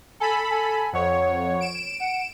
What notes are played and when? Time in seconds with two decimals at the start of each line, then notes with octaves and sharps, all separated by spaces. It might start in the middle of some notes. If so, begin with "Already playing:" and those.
0.20 A4 G#5 B5
0.50 G#5
0.93 F2 C#5 F#5
1.61 D7 E7
2.00 F#5